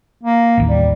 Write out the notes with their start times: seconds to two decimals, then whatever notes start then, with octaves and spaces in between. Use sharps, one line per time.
0.23 A#3
0.58 A1 D#2
0.69 G3